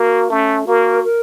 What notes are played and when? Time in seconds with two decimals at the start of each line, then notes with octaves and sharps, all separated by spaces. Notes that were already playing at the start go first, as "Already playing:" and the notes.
Already playing: A#3 F#4 A#4
0.30 A3 C#4
0.67 A#3 F#4 A#4
1.04 A#4